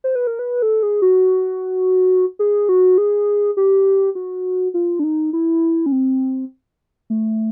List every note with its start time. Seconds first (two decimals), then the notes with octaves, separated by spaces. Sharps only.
0.04 C5
0.15 B4
0.27 A#4
0.39 B4
0.62 A4
0.83 G#4
1.02 F#4
2.39 G#4
2.69 F#4
2.98 G#4
3.57 G4
4.15 F#4
4.74 F4
4.99 D4
5.04 D#4
5.33 E4
5.86 C#4
5.92 C4
7.10 A3